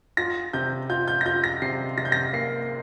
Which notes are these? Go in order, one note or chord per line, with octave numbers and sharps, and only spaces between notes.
F4 A#6
C3 G6
F4 G6
G6
A#6
F4 G6
A#6
C3 C7
C3 A#6
G6
A#6
A#3 C7